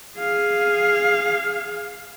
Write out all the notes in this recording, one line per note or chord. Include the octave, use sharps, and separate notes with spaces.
G#4 F5